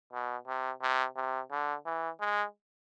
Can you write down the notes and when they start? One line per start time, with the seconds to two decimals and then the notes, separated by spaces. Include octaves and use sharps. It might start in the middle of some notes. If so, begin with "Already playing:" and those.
0.13 B2
0.47 C3
0.82 C3
1.16 C3
1.51 D3
1.85 E3
2.20 G#3